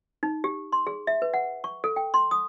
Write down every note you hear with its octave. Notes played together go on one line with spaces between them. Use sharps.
D#4
G4
C6
G#4
E5
B4
F#5
C#6
A4
G5
C6
D#6